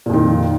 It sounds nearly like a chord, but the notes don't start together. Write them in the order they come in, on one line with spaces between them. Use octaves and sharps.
A#2 F2 D#3